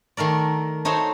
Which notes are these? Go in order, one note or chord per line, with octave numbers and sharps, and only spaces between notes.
D#3 A3 A#4 D5
A3 D#4 F#4 C5 C#5